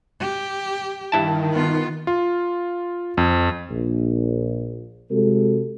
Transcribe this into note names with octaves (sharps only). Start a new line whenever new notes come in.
G4
G2 D#3 E4 A5
B3 F4
F4
F2
A#1
C3 G#3 F#4 A4